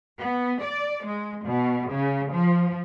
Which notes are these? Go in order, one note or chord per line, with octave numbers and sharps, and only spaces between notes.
B3
D5
G#3
B2
C#3
F3